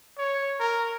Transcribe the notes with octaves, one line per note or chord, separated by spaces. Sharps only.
C#5
A#4